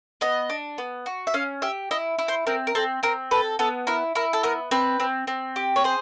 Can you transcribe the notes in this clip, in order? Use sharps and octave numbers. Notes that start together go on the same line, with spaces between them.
B3 D#5
D4
B3
F#4
E5
C#4 F5
G4 E5
E4 D#5
E4
C5
C4 A#4
A#4
C4 A4
C4 A#4
A4 B4
B3 A4
E4 A#4
E4 A#4
A4
B3 A#4
C4 B4
C4
C4
G4
C#5
G#4 C5